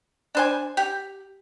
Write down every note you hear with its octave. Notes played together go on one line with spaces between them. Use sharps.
D4 C5 G#5
G4